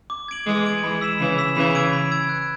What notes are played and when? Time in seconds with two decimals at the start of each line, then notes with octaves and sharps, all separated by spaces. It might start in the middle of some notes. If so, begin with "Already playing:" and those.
0.10 D6
0.28 G#6 D7 F#7
0.46 E3 G#3 D6
0.65 G#6 D7 F#7
0.83 E3 G#3 B5
1.01 E6 B6 E7
1.20 C#3 E3 B5
1.38 E6 B6 E7
1.56 C#3 E3 B5
1.75 E6 G#6 D7
1.93 B5
2.11 E6 G#6 D7
2.29 F#6